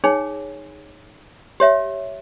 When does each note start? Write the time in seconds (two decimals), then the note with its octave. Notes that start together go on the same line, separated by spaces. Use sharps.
0.04 D#4 G#4 C#5 G#5
1.60 G4 C#5 E5